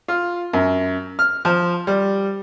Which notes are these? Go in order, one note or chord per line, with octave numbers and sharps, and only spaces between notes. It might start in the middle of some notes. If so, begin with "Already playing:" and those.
F4
F#2
F6
F3
G3